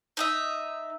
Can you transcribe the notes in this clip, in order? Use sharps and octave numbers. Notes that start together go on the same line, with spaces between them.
D#4 D#5 E5